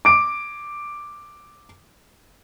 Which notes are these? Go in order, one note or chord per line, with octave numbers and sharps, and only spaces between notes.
D6 D7